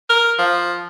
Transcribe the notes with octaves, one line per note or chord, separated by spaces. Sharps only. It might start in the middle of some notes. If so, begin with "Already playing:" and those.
A#4
F3